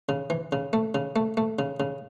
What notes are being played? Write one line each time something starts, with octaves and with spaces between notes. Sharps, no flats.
C#3
E3
C#3
A3
C#3
A3
A3
C#3
C#3